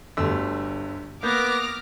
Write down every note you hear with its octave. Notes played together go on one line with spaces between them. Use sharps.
G1 D2 G3 A3 E6
A#3 B3 D6 F6 G6 A#6